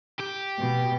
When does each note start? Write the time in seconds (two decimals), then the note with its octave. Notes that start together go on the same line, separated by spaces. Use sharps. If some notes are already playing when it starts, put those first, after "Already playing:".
0.20 G4
0.59 B2